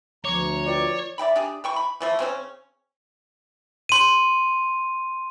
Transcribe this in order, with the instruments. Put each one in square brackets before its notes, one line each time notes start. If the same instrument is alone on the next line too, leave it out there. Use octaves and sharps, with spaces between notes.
[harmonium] D2 A#5 [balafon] F3 B3 D6 [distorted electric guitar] C#5
[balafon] F4 B4 G5 [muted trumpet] D5
[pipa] D5 E5 G5 B5
D4 G4 G#4
E3 G5 C#6
B5
E3 F3 A3
C#3 C4 C#4
[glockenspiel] C6 D#7